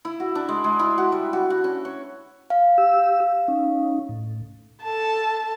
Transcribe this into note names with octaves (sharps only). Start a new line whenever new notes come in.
E4
F#4
D4
G#3
G#3
E4
F#4
G3
F#4
F#4
C#4
C#5
F5
G4 E6
C#4 D#4
A2
A4 A5